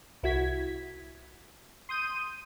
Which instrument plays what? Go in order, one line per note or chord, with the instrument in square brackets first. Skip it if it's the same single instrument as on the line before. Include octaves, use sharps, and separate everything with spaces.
[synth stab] C2 E4 F#4 G#6 B6
C6 D#6 G6 D#7